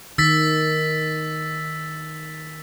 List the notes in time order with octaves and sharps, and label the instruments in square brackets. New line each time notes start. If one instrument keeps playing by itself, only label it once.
[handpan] D#3 [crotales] E6 A6 B6